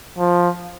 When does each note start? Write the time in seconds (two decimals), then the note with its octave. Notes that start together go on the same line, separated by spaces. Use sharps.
0.18 F3